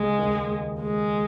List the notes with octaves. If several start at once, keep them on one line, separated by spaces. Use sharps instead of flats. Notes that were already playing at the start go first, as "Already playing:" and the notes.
Already playing: C#2 C#3 G#3
D#2 D#3
G#3